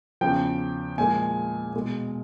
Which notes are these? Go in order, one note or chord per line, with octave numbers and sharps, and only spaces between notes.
E2 C#3 F3 G5
A#2 F3 G#3 G#5
B2 G#3